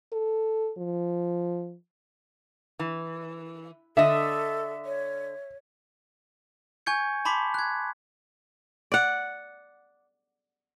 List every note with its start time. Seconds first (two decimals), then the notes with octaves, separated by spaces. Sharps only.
0.13 A4
0.78 F3
2.79 E3
3.97 D3 A4 D#5 E5
4.85 C#5
6.86 G#5 C#6 G6 G#6 C#7
7.25 A5 B5 C6 D6 B6
7.54 F#6 G#6
8.92 D5 F#5